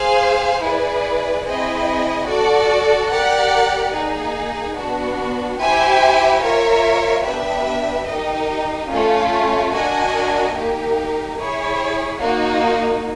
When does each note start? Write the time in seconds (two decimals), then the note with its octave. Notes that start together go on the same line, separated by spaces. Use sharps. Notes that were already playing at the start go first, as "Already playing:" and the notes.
Already playing: G#4 C5 F5
0.62 E4 G#4 B4 D5
1.45 C4 E4 G#4 C5 D#5
2.27 F#4 A4 D5
3.10 G4 A#4 D5 F#5
3.93 A#3 D#4 G#4
4.76 B3 D4 F#4
5.59 E4 G4 C5 E5 G#5
6.42 F4 A#4 C#5 E5
7.23 B3 D4 G4 B4 E5
8.07 D#4 G4 A#4 D#5
8.90 A3 C#4 F4
9.72 D4 F#4 A#4 D#5 G#5
10.55 A#3 D#4 G4 A#4
11.38 E4 G#4 C#5
12.20 A#3 D#4 F#4